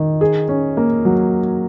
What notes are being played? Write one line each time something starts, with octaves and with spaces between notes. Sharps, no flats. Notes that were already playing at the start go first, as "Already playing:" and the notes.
Already playing: D#3
G#4
C#4
A#3
F#3